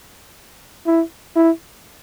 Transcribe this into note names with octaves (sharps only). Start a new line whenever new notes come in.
E4
E4